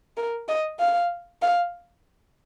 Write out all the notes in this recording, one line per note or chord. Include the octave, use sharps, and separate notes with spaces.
A#4
D#5
F5
F5